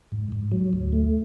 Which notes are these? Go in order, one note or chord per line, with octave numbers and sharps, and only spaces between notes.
G#2
G#2
F#3
D2
A3